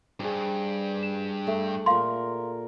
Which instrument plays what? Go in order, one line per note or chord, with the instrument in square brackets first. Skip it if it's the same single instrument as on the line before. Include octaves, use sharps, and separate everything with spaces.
[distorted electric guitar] G2 [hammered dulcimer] G#4 C5
[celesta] E7
[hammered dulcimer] A3 B5
[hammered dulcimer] A#2 A#4 [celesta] F5 C6